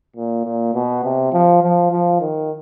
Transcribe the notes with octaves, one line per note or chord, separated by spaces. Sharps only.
A#2
A#2
B2
C3
F3
F3
F3
D#3